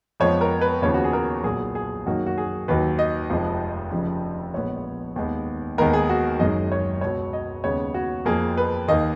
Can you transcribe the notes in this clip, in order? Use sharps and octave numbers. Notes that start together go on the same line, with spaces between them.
F2 F3 G#3 B3 C#5
A#4
B4
D#2 C#3 F3 B3 C#5
F#4
G#4
A#4
B1 A#2 F#3 B3 G#4
G#4
F#2 D#3 F#3 A#3 F#4
F#4
G#4
D#2 D#3 F#3 B4
D#5
F1 F2 F3 G#3
F1 F2 C#3 F3
A#1 A#2 G#3 B3 C#5
D#2 D#3 G#3 B3
D#2 D#3 G#3 B3 A#4
G#4
F#4
F#1 F#2 D#3 G#3 D#5
C#5
C#2 B2 F#3 C#5
D#5
D#2 C#3 G#3 B3 C#5
F#4
F2 F3 A#3 G#4
B4
D#2 D#3 A#3 D#5